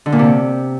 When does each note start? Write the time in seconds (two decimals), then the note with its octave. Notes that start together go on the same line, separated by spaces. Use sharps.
0.06 D3
0.12 A#2
0.19 C3